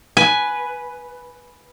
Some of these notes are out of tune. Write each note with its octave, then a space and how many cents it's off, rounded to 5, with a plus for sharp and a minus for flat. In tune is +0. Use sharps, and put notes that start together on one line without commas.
B4 +0 G#5 +10